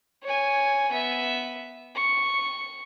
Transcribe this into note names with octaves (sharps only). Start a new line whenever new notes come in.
C#5 G#5
B3 E5
C#6